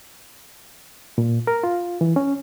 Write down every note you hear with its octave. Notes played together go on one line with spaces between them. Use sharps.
A#2
A#4
F4
E3
C#4